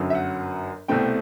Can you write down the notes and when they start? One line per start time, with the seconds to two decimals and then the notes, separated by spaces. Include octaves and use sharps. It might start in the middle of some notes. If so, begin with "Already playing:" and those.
Already playing: G1 F#2 F#3
0.10 E5
0.15 F#5
0.88 C2 B2 A3 C4 G5